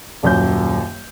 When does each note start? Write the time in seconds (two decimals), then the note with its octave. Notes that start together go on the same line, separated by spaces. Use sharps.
0.23 D#1 F#2 G6